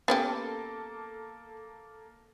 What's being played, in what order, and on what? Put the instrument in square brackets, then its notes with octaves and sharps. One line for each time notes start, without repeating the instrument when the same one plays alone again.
[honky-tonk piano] A#3 A4 [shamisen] B3 C#4 G4